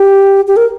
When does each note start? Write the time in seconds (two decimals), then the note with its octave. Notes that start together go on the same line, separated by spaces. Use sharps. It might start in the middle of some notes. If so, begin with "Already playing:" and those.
Already playing: G4
0.48 G4
0.57 A#4